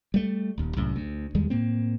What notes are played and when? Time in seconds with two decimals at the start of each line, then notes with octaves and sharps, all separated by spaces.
0.14 G3 A3
0.58 D#1 D#2
0.77 C2 F#2 A2
0.96 D2
1.35 E2 D#3 G3 G#3
1.50 A2 A#3 C4